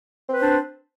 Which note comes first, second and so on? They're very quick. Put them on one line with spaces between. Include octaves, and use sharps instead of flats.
C4 B4 C5 D4